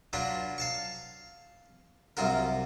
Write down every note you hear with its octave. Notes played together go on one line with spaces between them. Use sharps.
F#3 D4 F4 B4
F5 A5 C#6
C2 F#2 F4 F#4 A#4